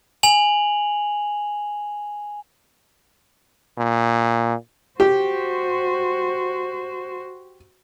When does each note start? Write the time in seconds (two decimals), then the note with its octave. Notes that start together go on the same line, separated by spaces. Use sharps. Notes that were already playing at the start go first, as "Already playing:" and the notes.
0.23 G#5 F7 F#7
3.78 A#2
5.00 F#4 G4 C5